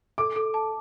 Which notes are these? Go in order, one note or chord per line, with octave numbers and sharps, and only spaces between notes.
A4 D6
A4
A5